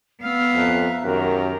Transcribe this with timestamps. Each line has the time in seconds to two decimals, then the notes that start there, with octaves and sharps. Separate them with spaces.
0.21 B3 F5 E6 F6
0.55 F2 E5 A#5 F#6
1.04 F#2 D#3 G4 A#4 A#5